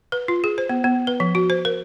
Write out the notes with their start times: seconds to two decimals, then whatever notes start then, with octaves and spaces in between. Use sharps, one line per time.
0.12 B4
0.28 F4
0.44 G#4
0.58 C5
0.69 B3
0.84 B3
1.07 B4
1.20 F3
1.35 F#4
1.50 C5
1.65 A#4